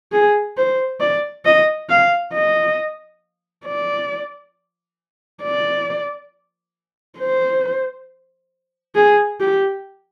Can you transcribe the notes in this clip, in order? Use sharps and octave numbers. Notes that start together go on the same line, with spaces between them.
G#4
C5
D5
D#5
F5
D#5
D5
D5
C5
G#4
G4